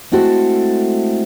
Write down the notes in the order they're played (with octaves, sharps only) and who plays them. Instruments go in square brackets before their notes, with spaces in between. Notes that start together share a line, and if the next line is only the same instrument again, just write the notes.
[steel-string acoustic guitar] G#3 A3 C4 E4 F#4 A4